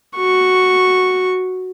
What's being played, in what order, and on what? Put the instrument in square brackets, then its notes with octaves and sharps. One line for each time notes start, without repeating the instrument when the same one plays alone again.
[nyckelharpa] F#4 C#6